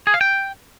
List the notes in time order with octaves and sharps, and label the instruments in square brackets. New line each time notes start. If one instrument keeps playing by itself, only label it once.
[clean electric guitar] G#4
F5
G5